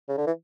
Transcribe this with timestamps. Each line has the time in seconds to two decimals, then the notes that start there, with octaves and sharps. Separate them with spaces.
0.09 C#3
0.17 D3
0.26 E3